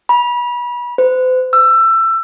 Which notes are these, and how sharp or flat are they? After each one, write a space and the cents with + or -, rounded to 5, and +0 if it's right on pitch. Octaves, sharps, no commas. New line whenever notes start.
B5 -30
C5 -40
E6 +20